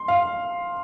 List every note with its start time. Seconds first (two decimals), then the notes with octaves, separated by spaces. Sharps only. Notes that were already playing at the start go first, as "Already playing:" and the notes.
Already playing: C6
0.08 F5